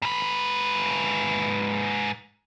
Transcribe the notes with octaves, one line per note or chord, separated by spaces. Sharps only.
G#2 B4